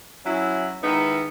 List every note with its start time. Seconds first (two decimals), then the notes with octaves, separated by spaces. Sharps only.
0.25 F#3 C#4 E4
0.82 D#3 G#3 B3 D#4 E4